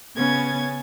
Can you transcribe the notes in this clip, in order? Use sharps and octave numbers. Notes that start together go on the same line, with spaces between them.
C#3 B3 C#4 G#6 A6